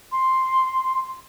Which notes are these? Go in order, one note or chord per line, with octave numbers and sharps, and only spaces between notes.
C6